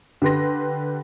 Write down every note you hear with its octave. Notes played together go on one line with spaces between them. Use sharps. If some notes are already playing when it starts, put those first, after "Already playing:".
D3 G4 B4 C6 A#6